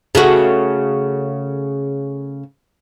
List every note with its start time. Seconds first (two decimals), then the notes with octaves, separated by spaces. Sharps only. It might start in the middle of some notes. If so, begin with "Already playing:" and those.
0.15 C#3 A3 F#4